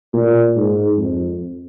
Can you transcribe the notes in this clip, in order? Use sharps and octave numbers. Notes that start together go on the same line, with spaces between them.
A#2
G#2
F2